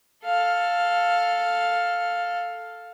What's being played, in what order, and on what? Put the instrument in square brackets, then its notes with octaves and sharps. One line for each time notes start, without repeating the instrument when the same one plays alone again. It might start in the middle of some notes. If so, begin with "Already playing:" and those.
[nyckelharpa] A4 F5